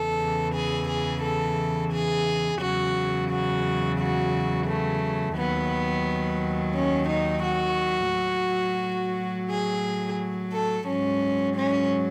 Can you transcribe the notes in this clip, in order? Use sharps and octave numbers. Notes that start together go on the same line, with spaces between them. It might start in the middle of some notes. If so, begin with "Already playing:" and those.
Already playing: E2 C#3 E3 A4
G#4
G#4
A4
G#4
E2 C#3 F#3 F#4
F#4
F#4
A3
D#2 D#3 F#3 B3
C#4
D#4
F#4
A2 F#3
G#4
A4
G#2 F#3 C#4
C#4